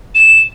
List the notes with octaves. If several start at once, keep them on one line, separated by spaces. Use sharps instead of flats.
E7